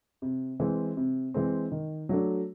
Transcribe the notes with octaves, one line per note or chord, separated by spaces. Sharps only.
C3
E3 G#3 C4
C3
E3 G#3 C4
D#3
F#3 A3 D4